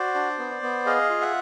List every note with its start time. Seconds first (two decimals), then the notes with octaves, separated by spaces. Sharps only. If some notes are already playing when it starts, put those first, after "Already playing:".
Already playing: F#4 C5 D5
0.15 D4
0.39 B3
0.62 B3
0.86 G#4 D#5 F5
1.09 F4
1.21 E5 F#5